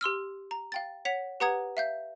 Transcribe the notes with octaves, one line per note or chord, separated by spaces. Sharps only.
G4 C6 E6 F6
A#5
F5 G5 A6
C#5 F#5 B6 F7
G4 B4 F#5 A#5 D#6 G#6
E5 F5 G6